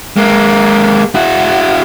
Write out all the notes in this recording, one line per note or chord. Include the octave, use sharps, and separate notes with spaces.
G#3 A#3
E4 F#4